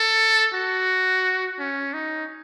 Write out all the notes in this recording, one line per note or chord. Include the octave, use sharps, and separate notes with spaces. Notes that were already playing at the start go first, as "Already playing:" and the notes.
Already playing: A4
F#4
C#4
D#4